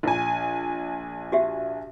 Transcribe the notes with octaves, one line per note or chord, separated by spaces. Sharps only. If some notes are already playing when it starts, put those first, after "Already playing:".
A#1 G#5
F#4 G4 E5